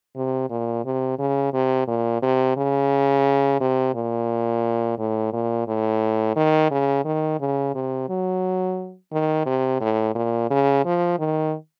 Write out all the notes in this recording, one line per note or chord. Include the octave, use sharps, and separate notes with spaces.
C3
A#2
C3
C#3
C3
A#2
C3
C#3
C3
A#2
A2
A#2
A2
D#3
C#3
D#3
C#3
C3
F#3
D#3
C3
A2
A#2
C#3
F3
D#3